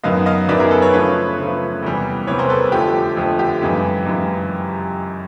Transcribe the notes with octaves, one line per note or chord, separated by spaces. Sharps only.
F#2 D#3 F#3 B3 D#5 F5
D#5 F5
F#2 D#3 F#3 B3 D5 E5
G#4 A#4
A4 B4
B4 C#5
C#3 F3 A3 B4 C#5
C#3 F3 A3
E2 C3 E3 G3
E2 C3 E3 G3 B4 C#5
A#4 C5
A4 B4
F2 D3 F3 A3 G4
F2 D3 F3 A3
G4
F#2 C#3 E3 G#3
F#2 C#3 E3 G#3